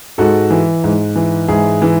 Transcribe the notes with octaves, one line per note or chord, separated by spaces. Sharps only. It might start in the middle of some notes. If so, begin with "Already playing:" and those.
G#2 F#4 A4
E3
G#2
E3
G#2 E4 G#4
E3